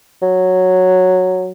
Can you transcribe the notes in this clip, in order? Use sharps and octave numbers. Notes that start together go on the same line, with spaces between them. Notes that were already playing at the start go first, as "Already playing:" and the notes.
F#3